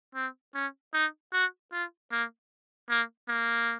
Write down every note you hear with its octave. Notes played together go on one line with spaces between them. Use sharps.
C4
C#4
D#4
F#4
F4
A#3
A#3
A#3